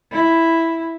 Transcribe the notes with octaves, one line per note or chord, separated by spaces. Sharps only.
E4